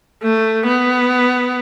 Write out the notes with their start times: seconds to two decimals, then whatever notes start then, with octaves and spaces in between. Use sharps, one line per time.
0.23 A3
0.66 B3